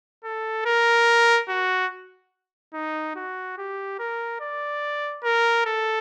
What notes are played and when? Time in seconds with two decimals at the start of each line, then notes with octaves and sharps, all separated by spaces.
0.24 A4
0.66 A#4
1.49 F#4
2.74 D#4
3.16 F#4
3.58 G4
3.99 A#4
4.41 D5
5.24 A#4
5.66 A4